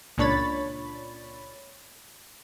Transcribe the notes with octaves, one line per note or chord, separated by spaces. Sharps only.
C#2 A#2 D4 C#5 B5 A6